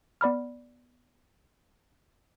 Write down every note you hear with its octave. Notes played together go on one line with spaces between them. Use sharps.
B3 D5 B5 F6